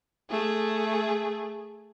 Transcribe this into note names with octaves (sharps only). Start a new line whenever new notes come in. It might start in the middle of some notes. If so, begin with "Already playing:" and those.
A3 G#4